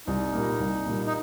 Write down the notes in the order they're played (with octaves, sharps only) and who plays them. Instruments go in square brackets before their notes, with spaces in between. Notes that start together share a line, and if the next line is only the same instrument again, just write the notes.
[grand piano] C2 [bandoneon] D#4
[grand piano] A#2 G3 A#3
C2
A#2 G3 A#3
[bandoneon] D#4